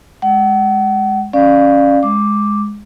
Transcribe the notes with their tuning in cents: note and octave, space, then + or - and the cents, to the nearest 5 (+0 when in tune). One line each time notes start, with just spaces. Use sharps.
G#3 +0 F#5 +35
C#4 +0 D5 +15 F5 +0
G#3 +0 D6 +0